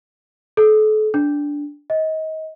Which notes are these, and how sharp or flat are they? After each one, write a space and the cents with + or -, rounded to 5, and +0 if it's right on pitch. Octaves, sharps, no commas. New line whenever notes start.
A4 -40
D4 -10
D#5 +25